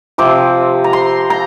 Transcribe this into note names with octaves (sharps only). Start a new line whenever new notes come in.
C3 F3 C4 D6
A#5
C6
A#5